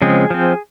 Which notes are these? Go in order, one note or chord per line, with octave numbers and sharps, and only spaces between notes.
C#3 F3 G#3 C4 G#4
F3 C4